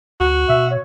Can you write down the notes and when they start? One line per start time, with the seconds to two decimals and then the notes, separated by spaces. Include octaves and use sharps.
0.20 D2 F#4
0.49 B2 E5
0.71 C#5